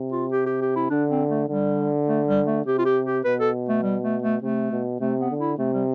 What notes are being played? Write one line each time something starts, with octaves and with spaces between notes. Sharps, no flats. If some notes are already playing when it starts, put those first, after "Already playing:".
Already playing: C3
F4
G4
G4
G4
E4
D3 D4
C4
A3
D3 G3
A3
G3
A3
C3 G4
F4
G4
G4
B2 B4
A4
A3
G3
A3
A3
C3 A3
B2
C3 A3
B3
D3
E4
C3 A3
G3